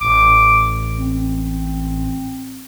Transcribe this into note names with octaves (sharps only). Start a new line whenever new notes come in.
A1 D6
C4